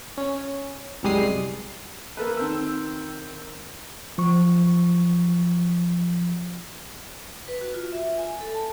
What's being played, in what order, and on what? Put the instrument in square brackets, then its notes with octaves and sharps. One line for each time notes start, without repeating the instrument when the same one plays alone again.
[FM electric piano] C#4
C2 F#2 G3 G#3 D#6 C7
[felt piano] A#3 A4 B4
D#3 C4 E6
[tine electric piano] F3 C#6
[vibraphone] B4
F#4
F4
E5
G#5
A4
A5